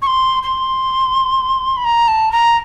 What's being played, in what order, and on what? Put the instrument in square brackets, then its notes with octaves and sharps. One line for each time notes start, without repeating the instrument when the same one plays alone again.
[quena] C#6
C6
C6
B5
A#5
A5
A#5